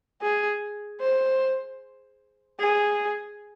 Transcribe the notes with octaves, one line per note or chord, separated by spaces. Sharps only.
G#4
C5
G#4